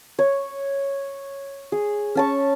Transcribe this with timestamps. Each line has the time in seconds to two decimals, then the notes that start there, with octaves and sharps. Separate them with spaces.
0.19 C#5
1.72 G#4
2.15 C#4 A5 C#6